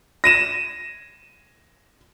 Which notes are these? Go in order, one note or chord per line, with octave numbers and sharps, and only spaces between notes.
A#6 D#7 E7